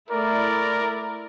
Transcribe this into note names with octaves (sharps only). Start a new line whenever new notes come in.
A3 E4 A#4 D5